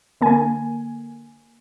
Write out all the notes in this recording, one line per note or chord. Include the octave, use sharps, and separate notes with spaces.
D3 A#3 G#5